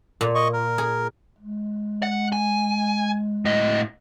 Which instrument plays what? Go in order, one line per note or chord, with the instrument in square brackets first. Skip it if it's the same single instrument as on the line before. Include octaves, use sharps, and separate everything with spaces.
[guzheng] A#2
[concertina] D#5 C#6
A#4
[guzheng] G#4
[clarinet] G#3
[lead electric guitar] F#5
G#5
A2 D#5